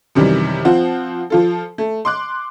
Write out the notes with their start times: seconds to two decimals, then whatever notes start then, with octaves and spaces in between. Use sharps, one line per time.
0.15 F#2 C3 D#3 E3 G3
0.65 F3 C4 F4 F#5
1.30 F3 F4 A4
1.78 A3
2.05 C6 D6 F#6